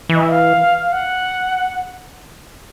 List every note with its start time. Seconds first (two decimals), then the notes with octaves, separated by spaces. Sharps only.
0.09 E3
0.15 D#5
0.23 E5
0.30 F5
0.82 F5
0.92 F#5